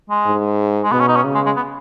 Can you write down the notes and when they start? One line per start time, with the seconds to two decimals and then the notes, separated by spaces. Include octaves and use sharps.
0.10 G#3
0.26 G#2
0.84 G#3
0.92 B2 B3
1.00 C#4
1.08 D#4
1.16 C#4
1.24 C#3
1.35 G#3
1.46 G#3
1.56 B3